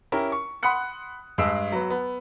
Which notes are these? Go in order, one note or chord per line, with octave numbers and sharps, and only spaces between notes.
C#4 E4 G4 A#4
C#6
F#5 B5 C6 D#6 F#6 C#7
G2 G#3 G#4 E6 D7
F#3 B3
B3